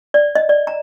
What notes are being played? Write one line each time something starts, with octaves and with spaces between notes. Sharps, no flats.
D5
D#5
D5
A#5